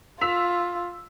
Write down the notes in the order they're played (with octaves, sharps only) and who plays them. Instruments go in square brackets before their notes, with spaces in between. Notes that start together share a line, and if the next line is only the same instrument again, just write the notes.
[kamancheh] F4 [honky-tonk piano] E6 B6 F7